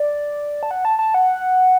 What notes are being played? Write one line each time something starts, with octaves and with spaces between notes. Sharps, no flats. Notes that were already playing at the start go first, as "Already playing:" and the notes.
Already playing: D5
A5
F#5
A5
A5
F#5